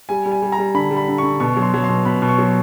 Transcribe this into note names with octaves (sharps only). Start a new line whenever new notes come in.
G3 G#5
G3
G#5
G3
A#5
G3
D3 B5
G3
B5
D3
D3 C#6
B2 C#6
F#3
C6
F#3
C6
B2
B2 B5
B2
C#6
F#3